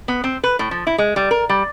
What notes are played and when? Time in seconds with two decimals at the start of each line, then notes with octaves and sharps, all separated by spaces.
0.08 B3
0.24 C4
0.44 B4
0.59 A2
0.71 F3
0.87 E4
0.98 G#3
1.16 G3
1.31 A#4
1.49 G3